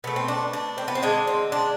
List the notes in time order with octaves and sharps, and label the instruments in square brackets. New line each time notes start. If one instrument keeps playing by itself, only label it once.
[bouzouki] B2 A3 B3
C4
D4
D4
C4
B3
C4
D3 G#3 D4
C4
D4